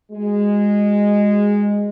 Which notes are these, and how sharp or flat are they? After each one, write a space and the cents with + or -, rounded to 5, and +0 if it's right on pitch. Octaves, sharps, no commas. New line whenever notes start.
G#3 -15 F#4 -5